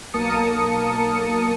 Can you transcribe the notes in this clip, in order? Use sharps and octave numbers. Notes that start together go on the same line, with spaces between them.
B1 A#3 A#4 A5 D#6 C#7